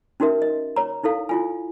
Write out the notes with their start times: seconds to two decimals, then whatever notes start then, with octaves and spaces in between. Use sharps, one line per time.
0.20 C#4 D#4 F#4 A#4 E5
0.42 D#5
0.76 C#5 A#5
1.03 D#4 E4 A4 F5
1.29 E4 F4 G#5